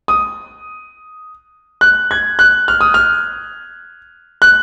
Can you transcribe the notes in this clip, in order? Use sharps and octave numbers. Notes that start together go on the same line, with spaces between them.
D#6
F#6
G#6
F#6
F6
D#6
F6
F#6